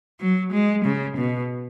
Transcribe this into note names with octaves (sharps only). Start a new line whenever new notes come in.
F#3
G#3
C#3
B2